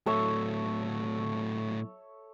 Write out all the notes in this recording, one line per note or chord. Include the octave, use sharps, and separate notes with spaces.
A2 F#3 A4 C#5 E5